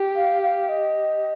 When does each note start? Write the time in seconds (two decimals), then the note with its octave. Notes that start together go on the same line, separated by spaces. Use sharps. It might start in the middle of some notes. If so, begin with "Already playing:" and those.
Already playing: G4
0.16 F5
0.43 F5
0.69 D#5